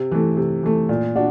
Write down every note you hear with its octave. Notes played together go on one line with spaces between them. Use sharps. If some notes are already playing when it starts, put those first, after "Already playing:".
Already playing: C3
E3 A3
C3
E3 A3
A#2
D4 F#4